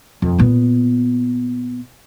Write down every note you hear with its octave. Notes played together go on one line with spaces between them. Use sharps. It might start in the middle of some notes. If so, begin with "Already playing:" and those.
F2
A#2 B3